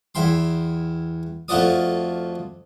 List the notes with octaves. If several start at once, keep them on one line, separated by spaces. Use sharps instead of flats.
E2 E4 G5 C6
F2 A3 F4 F#4 D5 D#6